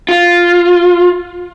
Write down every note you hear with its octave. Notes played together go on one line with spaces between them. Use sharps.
F4